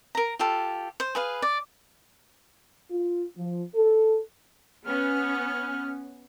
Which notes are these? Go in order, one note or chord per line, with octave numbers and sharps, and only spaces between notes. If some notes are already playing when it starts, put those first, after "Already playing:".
A#4 A#5
F4 G4 A4
C5
G#4 B4 F5
D5
F4
F3
A4
B3 C#4 F6